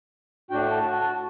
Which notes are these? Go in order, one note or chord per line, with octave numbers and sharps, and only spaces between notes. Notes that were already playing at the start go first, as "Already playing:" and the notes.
A2 D4 F#4 G5
A5
F#4